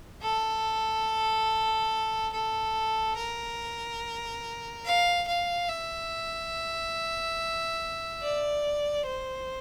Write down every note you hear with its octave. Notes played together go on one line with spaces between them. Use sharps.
A4
A4
A#4
F5
F5
E5
D5
C5